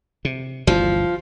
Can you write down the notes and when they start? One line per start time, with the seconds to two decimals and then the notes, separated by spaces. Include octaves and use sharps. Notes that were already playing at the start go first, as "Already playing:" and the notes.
0.25 C3
0.67 G1 D2 E3 F3